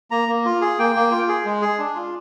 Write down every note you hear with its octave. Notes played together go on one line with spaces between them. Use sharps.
A#3 A#5
A#3
F4
G#4
A#3 G5
A#3
F4
G#4
G#3
G#4
D4
F4